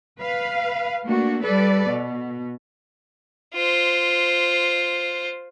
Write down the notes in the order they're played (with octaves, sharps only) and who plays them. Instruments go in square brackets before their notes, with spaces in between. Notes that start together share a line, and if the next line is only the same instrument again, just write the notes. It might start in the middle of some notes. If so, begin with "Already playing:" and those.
[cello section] B4 F5
A3 A#3 D4 F#4
G3 A4 B4 D5
B2
[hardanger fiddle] F4 C5